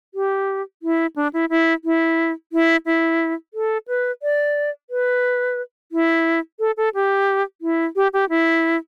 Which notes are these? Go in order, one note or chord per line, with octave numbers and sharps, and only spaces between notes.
G4
E4
D4
E4
E4
E4
E4
E4
A4
B4
D5
B4
E4
A4
A4
G4
E4
G4
G4
E4